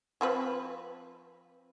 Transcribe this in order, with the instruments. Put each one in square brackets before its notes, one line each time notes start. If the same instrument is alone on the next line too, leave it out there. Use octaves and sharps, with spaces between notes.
[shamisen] F3 C4 B4